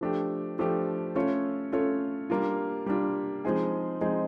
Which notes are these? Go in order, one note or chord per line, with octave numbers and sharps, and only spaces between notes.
F3 A3 D4 G4
F3 A3 D4 G4
A3 C#4 F4 A4 C#5
A3 C#4 F4 A4 C#5
G3 A#3 D4 F4
G3 A#3 D4 F4
F3 G#3 C4 D#4 G#4
F3 G#3 C4 D#4 G#4